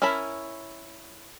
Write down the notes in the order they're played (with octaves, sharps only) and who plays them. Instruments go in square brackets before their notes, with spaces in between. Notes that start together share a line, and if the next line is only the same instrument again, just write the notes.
[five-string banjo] C#4 E4 A#4 A5 B5